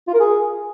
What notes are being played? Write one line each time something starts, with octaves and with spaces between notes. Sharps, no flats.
F4
A#4
G#4